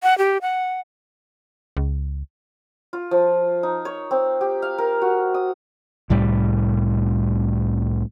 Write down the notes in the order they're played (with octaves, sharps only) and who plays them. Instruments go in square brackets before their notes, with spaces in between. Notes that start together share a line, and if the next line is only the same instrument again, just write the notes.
[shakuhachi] F#5
G4
F#5
[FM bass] C#2
[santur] F4
F3
D#4
C#5
C4
G4
F5
A#4
F#4
D#6
[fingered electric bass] C2 A2 G3